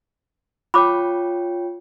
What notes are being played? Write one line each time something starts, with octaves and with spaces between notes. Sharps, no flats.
F4 C#5 G5 B5 D6